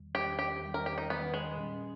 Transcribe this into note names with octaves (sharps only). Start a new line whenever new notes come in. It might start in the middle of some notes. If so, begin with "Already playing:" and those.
Already playing: E2 D#3 G3
E2 D#3 G3 G4
G4
E2 D#3 G3
A#4
G4
D#4
E2 D#3 G3 B3
G#3
A#2 G3 C#4